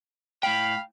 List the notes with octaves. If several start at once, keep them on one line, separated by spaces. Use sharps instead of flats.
A2 F5 G5 B5